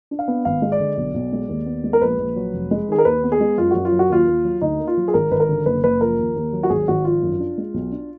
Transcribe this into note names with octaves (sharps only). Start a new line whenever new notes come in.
D4
F5
B3
G#1 F5
G#3
D5
D3
B1
B1
G#3
D#2
B3
G#3
A#4
A#1 B4
A#1
F#3
F1
G#3
D#3 G#4
A#4
D#2 B4
B3
G#4
G#3
F#2 F4
F#2 F#4
F4
F#3
F#4
D#2 F4
D#2
F#3
D2 D#4
A#3
F4
F#3
G#4
G#1 A#4
G#1 B4
A#4
D3
F#1 B4
F#1 B4
F3 A#4
D#2
D#2
F#3
F#4
G#1 G#4
G#1 F#4
F3 F4
F#2
D4
G#3
B1
D4